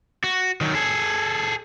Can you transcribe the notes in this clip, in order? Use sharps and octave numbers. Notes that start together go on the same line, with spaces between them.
F#4
D#3 F#3
G#4 A4